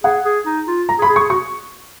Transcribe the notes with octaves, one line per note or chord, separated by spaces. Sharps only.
G#4 F#5
G#4
D#4
F4
A#5
G#4
B5
G#4
C#6
G#4
F#4 C#6